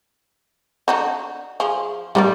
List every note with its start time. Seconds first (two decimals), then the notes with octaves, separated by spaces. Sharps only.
0.88 D4 D#4 F#4
1.60 F3 G#4
2.15 D#3 G3 F4 D5